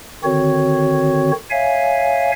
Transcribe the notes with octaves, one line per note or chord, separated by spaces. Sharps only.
D3 D#3 C4 F#4 C#5
C#5 E5 F5 G#5